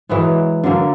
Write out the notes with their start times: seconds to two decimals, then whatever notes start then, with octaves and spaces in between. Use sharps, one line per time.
0.09 E3 F#3 G#3
0.64 D3 F#3 A#3 A4